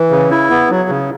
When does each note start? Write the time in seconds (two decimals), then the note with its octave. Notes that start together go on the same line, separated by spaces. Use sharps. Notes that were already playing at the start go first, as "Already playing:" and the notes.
Already playing: E3
0.11 C#3
0.31 E4
0.50 B3
0.70 F#3
0.89 C#3